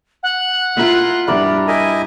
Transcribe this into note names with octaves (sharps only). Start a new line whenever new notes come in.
F#5
E4 F4 A#4 E5
G2 E4 A#4 D5 D6
E4 A#4 D#5 G5 G#5